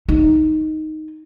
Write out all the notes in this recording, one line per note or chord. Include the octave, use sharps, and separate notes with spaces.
D#4